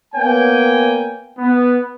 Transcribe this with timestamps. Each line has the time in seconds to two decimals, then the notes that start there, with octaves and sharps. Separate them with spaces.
0.15 A#3 B3 C#5 G5 G#5
1.39 B3